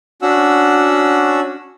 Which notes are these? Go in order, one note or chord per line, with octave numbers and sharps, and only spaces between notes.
C#4 D4 F#4 F#5 E6